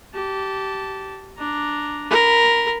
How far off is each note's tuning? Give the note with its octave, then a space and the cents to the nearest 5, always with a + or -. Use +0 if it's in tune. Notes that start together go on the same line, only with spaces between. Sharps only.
G4 -20 A5 +0
D4 +0 A#5 +0
A#4 +0 B5 +10